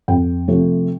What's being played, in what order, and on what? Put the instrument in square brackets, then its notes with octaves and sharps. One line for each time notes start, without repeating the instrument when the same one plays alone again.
[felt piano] F2 G5
C3 F3 A3